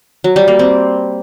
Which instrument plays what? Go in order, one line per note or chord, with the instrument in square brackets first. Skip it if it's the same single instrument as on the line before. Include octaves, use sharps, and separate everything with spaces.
[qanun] F#3
G3
A#3
C4